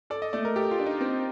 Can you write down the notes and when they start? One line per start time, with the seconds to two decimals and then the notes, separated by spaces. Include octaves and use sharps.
0.10 A4 D5
0.22 D#5
0.33 A3 D5
0.45 A#4
0.56 G4 A4
0.71 F4
0.79 D4
0.86 D#4
1.01 C4